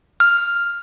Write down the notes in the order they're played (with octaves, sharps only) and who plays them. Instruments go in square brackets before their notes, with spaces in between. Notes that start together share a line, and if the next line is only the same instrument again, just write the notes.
[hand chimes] F6